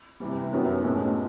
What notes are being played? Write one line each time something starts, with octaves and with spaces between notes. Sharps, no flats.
C3 E3 G3
F#2 D#3 F#3 B3
B1 A2 F3 G#3 C#4